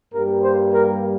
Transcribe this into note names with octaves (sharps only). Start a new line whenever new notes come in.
G2 G3 A#3 A#4
C5
A#4